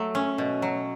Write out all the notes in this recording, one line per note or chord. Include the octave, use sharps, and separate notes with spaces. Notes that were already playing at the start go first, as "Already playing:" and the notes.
Already playing: F#3 A3
C#4
B2
F#3